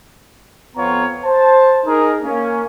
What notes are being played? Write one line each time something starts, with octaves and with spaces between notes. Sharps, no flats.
F2 B3 C4 F4 C#5 A#5
C5 A5
D#4 G#4 A#4
A#3 C#4